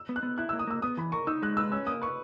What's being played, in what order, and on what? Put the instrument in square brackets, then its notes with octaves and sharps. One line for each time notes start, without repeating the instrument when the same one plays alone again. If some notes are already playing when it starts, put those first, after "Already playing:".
Already playing: [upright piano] E6
[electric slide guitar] B3
[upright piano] F#6
[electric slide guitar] B3
[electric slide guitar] E4 [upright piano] F#6
[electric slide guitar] A#3 [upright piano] E6
[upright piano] D#6
[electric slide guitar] A#3 [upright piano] E6
[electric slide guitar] B3 [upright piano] D#6
[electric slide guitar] E3 [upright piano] B5
[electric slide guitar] A#4 [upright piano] C#6
[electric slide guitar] D#4 [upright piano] E6
[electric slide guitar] G#3 [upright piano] F#6
[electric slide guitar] B4 [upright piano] E6
[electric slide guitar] C#4 [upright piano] E6
[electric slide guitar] A#3 [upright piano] D#6
[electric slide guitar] B4 [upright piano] C#6